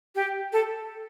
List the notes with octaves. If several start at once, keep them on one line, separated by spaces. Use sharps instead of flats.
G4
A4